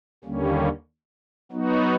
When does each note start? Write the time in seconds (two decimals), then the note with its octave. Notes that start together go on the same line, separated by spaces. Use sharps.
0.24 D#2 D3 G3 A#3 C#4
1.51 F#3 B3 D#4 F#4